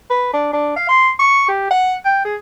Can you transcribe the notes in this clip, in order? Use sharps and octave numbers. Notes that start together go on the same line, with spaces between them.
B4
D4
D4
F5
C6
C#6
G4
F#5
G5
G#4